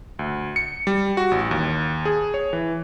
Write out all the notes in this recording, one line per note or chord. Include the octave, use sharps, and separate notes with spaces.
D2
C#7
G3
F#4
A1
D#2
G#4
C#5
E3